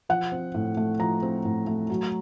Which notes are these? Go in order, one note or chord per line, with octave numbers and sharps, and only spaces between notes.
F3 F#5
C4
A2
A3
F3 A#5
C4
A2
A3
F#3